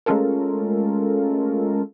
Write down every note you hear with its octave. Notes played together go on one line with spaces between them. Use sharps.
G#3 A3 C#4 F4 A4 A#4